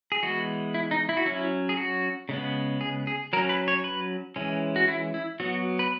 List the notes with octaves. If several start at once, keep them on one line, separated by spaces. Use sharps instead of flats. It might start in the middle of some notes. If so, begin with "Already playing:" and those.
G#4
E3 G#3 B3 F#4
E4
D#4
E4
F#4
F#3 C#4 E4
G#4
F#4
C#3 G#3 B3
G#4
G#4
F#3 C#4 A#4
B4
C#5
B4
E3 G#3 C#4
F#4
E4
E4
F#3 B3 F#4
B4